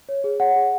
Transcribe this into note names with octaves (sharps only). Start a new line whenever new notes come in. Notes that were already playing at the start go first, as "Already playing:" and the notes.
C#5
G#4
C#5 F#5
G#4